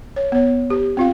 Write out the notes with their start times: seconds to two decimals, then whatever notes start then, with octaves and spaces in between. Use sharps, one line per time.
0.16 C#5
0.32 B3 C#5
0.70 G4
0.97 C4 F4 F5